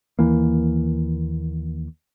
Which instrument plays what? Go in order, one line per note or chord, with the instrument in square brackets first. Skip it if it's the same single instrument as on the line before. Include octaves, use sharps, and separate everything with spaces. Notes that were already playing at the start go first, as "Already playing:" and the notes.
[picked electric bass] D#2 E3 A#3